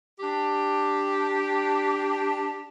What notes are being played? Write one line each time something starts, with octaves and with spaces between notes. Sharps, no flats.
D4 G4